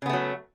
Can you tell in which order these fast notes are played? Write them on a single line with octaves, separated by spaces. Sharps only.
C#3 B3 A3 F#3